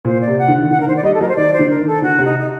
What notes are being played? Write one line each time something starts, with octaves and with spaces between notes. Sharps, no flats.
A#2 C5
D5
C3
F#5
D3
D#3
D3 F#5
A#4
D#3 C5
D5
G3 D#5
A4
F#3 A#4
C5
D#3 D5
C5
D3
A#4
D#3
A4
D3 F#4
C3
D#4
D#4